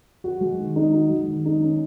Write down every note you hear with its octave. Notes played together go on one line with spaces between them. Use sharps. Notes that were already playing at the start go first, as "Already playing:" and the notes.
F#4
G#3
D#3
D#4
F#4
G#3
D#3
D#4
C#4